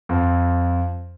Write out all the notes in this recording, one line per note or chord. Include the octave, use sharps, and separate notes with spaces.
F2